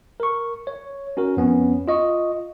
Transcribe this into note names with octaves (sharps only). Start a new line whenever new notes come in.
A#4 C#6
C#5
C#4 F#4 A#4
F2 B3 C#4
F4 D#5 C#6